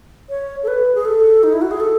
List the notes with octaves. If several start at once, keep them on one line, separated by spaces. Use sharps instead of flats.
C#5
A4
B4
G#4
A4
D#4
E4
F#4
G#4
A4